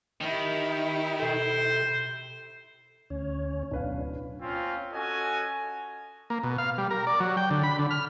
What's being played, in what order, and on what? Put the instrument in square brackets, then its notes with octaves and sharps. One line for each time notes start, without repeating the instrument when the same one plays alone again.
[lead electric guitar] D#3 [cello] E4 G4
[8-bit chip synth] B2 A4 [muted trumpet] C5
[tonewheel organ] D2 C#4 C#5
[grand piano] D1 B4 F5 [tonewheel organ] B2 C#4 D4
[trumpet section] A#3 C4 C#4 F4
C#4 F#4 A4 D#5 G#5
[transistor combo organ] A#3
B2
F5
G3
A#4
D5
F#3
G5
D3
B5
D3
F6